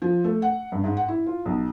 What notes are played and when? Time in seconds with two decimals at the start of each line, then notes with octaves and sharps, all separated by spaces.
0.02 F3
0.24 A3
0.42 F#5
0.72 G2
0.84 G#2
0.97 F#5
1.08 E4
1.26 F4
1.45 B1